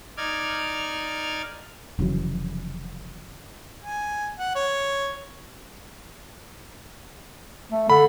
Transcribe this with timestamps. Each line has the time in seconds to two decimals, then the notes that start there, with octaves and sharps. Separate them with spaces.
0.17 D#4 D5 F6 G#6
1.99 F1 C#3 E3 F#3
3.83 G#5
4.39 F#5
4.55 C#5
7.72 A3
7.90 D3 B5